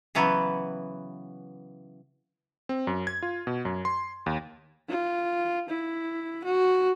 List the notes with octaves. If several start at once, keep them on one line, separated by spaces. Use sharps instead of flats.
C#3 E3 F#3 B3
C4
F#2
G#6
F4
B2
F#2
C6
D#2
F4
E4
F#4